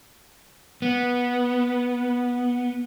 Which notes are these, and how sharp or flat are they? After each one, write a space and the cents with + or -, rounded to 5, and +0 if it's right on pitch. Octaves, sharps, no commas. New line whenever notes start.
B3 -10